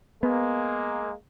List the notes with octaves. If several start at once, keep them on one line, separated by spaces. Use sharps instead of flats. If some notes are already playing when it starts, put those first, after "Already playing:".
G#3 A#3 B3